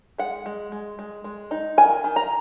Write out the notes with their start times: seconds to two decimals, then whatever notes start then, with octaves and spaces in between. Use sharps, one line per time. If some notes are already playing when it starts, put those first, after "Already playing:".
0.18 G#3 F#5
0.46 G#3
0.72 G#3
0.99 G#3
1.24 G#3
1.51 D#4
1.78 D#3 G#5
2.04 D#3
2.16 A#5